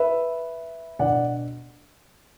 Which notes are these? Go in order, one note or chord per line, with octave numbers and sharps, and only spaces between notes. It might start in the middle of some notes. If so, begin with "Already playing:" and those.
Already playing: B4 E5
B2 B3 D4 D5 F#5